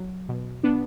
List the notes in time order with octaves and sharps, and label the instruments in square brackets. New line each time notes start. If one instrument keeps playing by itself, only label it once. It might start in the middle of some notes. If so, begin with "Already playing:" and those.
Already playing: [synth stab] F#3
B2
B3 D4